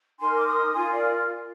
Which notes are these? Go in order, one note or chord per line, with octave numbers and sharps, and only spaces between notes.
D#4 A#4 G#5 C6
D6
C6 D#6
F4 A#4 G#5 C6
D5 F5